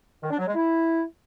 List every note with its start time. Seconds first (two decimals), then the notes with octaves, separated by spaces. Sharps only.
0.22 D#3
0.30 D4
0.38 F#3
0.46 G#3
0.54 E4